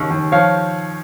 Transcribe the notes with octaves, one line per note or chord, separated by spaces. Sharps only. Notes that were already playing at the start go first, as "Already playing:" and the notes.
Already playing: D#2 C#3
D#2
F3 C#5 F5